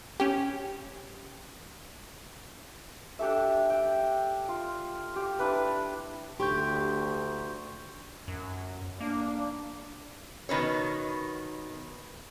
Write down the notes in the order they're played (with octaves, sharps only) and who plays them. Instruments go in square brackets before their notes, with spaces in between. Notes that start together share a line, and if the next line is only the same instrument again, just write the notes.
[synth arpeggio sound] C#4 G4
[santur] D4 G4 A4 E5
G5
F4
G4
D4 E4 B4
[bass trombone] D2 [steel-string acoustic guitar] G4 [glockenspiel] C6 C#6 G6
[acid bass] F#2
[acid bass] A#3 [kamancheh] D4
[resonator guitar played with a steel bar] B2 D#3 B4 C#5